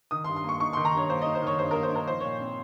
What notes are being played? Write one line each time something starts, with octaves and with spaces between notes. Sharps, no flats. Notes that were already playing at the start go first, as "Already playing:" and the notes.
D#3 D#6
C6
G2
C6
A#3 C#6
D#4 C#6
D#3 C6
A#5
G2 C#5
A#3 C5
D#4 D#5
C5
D#3 C#5
G2 C5
A#3 A#4
C5
D#4 A#4
F3 C5
A#2 C#5
C4